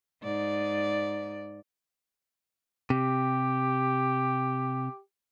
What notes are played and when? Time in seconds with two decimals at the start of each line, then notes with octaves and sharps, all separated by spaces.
0.23 G#2 D5
2.90 C3 G4